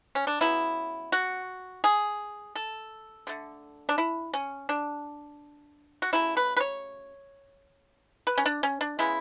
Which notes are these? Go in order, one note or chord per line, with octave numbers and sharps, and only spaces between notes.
C#4
D4
C#3 F#3 B3 E4
F#4
G#4
A4
D3 A3
D4
E4
C#4
D4
F#4
C#3 F#3 A3 E4
B4
B4
C#5
B4
C#4
D4
C#4
D4
C#3 G#3 B3 E4